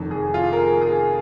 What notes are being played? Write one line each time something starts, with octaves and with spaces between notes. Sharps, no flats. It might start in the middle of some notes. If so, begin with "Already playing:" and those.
Already playing: F1 F2 D#3
G#4
F4
A#4
G#4
G#4